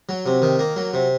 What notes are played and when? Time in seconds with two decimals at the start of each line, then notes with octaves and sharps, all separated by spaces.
0.09 F#3
0.26 C3
0.42 D#3
0.59 A#3
0.76 F#3
0.93 C3